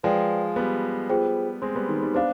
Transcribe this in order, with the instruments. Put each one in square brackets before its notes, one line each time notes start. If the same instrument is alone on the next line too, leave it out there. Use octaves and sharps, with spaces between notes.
[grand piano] F3 G#3 [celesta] B4 D5 G5
[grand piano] G3 B3
[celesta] F4 G#4 C5 G5
[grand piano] G#3 C4
G3 B3
D#3
D#3 G3
[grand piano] B3 D4 [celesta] C5 F5